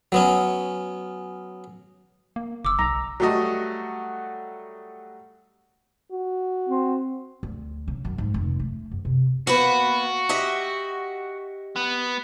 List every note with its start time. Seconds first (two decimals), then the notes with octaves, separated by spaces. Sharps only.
0.12 F#3 B3 C#4
2.36 A#3
2.65 F#1 D6 E6
2.79 B1 A#5
3.20 F#3 G3 A3 F#4 D#5
6.12 F#4
6.69 C4
7.43 D2
7.88 C#3
8.05 F#2
8.18 G#2
8.34 F1
8.60 A3
8.91 F#2
9.05 C3
9.47 A#3 B3 F#4 B4
10.29 G4 D#5 E5
11.76 B3